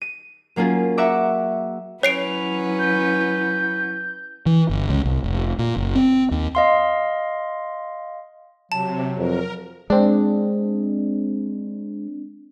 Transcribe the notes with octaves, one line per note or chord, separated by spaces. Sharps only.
D#7
F#3 A#3 C#4 F4 G#4
E5 F#5 A#5 C#6 D6 E6
F#3 C#4 E4 B4 C#5 C7 D7 F7
G6
E3
G1
C#2
C2
F1
A#2
F#1
C4
D#2
D#5 F5 C6
C3 F#3 A5
F2 A#4
G#3 C4 D4